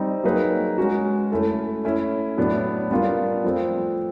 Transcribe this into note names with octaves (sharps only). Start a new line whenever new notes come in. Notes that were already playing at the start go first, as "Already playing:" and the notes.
Already playing: G3 C4 D#4
F#3 A#3 D#4 G#4 B4
G#3 C#4 F#4
A3 C#4 E4 A4
A3 C#4 E4
A2 F#3 B3 D4
G3 B3 D4 F4 A#4
F3 A3 C4